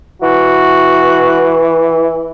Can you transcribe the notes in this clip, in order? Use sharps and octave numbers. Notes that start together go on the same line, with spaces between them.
E3 F#4